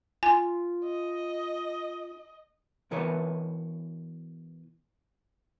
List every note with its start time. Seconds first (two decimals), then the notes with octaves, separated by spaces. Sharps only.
0.23 F4 G#5
0.84 D#5
2.91 B2 E3 A#4 B4 C#5